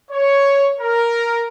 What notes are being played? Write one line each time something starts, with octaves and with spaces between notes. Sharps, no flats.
C#5
A#4